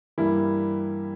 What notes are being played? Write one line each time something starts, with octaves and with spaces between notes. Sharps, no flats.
G2 E3 G3 A#3 E4